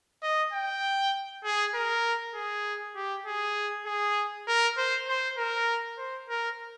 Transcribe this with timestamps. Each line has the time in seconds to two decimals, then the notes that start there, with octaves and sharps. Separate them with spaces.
0.23 D#5
0.53 G5
1.44 G#4
1.74 A#4
2.35 G#4
2.95 G4
3.26 G#4
3.86 G#4
4.47 A#4
4.77 C5
5.08 C5
5.37 A#4
5.98 C5
6.28 A#4